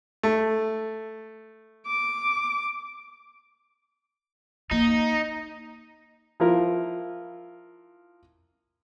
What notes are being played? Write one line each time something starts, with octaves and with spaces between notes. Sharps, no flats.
A3
D6
A#3 D#4
F3 E4 F4 A#4